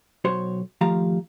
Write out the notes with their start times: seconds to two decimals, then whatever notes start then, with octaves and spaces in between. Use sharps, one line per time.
0.25 B1 F#4 C5 C#5 C6
0.81 D#2 F3 A3 G4 F5 A#5